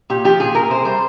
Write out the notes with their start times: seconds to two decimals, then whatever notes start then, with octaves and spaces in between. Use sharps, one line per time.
0.10 A#2 G4
0.24 F3 G4
0.40 A#2 G#4
0.55 A#2 A#4
0.70 C3 C5
0.85 G3 C5